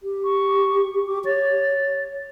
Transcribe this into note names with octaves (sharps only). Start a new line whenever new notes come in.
G4
C#6
G4 D6
C#5 A6